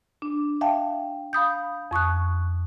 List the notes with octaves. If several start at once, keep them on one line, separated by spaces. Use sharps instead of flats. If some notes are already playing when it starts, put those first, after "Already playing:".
D4
E5 F5 G5 A5
F5 B5 D#6 G6
F2 C#6 D#6 F#6